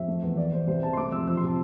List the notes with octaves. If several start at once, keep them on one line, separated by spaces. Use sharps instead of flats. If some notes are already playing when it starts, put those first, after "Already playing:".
Already playing: F2 E5
A3
E2
E2 D5
E2 C5
C2 C5
C3 A5
C6
A3 D6
F2 E6
F3 E6
C6
C3 A5